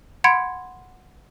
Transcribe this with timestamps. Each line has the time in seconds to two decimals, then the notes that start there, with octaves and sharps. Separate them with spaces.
0.24 F#5 B5 C6 G#6 C#7 D7